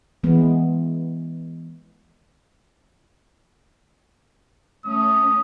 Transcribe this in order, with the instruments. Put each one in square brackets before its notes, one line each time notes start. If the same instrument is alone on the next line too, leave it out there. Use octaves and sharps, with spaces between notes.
[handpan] E3 G#3 B3
[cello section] A3 C#4 [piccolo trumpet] D#6